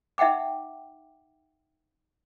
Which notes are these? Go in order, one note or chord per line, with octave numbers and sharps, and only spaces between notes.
D#4 E5 F#5 G5 D6